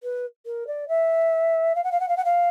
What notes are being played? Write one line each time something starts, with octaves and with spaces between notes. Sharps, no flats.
B4
A#4
D5
E5
F5
F#5
F5
F#5
F5
F#5
F5